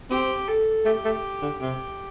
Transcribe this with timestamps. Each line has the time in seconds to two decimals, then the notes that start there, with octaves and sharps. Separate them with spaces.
0.10 C4 G4
0.48 A4
0.85 A3 G4
1.05 A3
1.42 D3
1.61 C3 G4